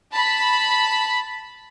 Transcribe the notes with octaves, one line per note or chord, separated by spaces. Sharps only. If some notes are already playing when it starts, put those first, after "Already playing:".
A5 B5 B6